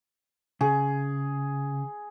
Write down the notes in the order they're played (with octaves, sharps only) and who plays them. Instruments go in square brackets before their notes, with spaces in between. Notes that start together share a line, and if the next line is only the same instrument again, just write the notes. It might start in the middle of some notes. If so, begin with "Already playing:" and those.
[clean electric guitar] C#3 [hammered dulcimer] G#4